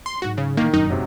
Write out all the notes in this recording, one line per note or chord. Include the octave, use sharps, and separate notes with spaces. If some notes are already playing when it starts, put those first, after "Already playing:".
C6
G#2 F#3 F#4
C#3
A#2 D#3 E3 A#3
F1 A#1 F#2 D#4
G#2 C3 F#3